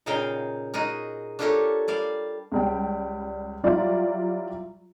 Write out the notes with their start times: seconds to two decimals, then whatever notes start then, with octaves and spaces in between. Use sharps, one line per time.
0.06 A#2 C#3 D#4 A#4 F5 G5
0.74 D#4 F#4 G#4 A#4
1.39 D4 F4 G4 A4 A#4 C#5
1.88 G3 D5 F5
2.52 C#2 G3 G5
3.64 F#3 G3 E4 F4 G4 D5